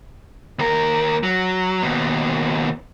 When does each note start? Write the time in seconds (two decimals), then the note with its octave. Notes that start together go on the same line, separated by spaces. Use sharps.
0.59 D#2 A#4
1.23 F#3
1.82 D#2 B2